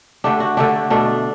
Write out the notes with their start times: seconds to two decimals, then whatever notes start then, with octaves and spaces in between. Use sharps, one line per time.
0.24 D3 A3 D4 G4
0.40 F#4
0.57 D3 A3 D4 G4
0.90 B2 A3 D4